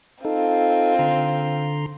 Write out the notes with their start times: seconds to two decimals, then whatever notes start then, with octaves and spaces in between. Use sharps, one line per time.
0.25 C4 D#4 F4 A4
0.99 D3 A#5 C6